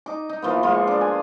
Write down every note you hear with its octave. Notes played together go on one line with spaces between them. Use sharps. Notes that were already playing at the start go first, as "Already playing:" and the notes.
D#4 D6
D#4
E3 F3 A#3 B3
F3 G#3 F4 C#6
D4
G#5